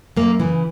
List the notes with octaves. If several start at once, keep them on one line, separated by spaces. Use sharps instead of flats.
F#2 A#3
C#3 E3